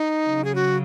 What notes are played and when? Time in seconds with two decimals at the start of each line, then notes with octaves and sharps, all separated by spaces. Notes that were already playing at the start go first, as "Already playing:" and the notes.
Already playing: D#4
0.24 C#3 F#3
0.44 G#4
0.55 F#4